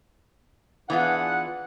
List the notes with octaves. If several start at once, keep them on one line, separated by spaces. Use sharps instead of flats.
E3 B3 D4 F4 G#4 F#5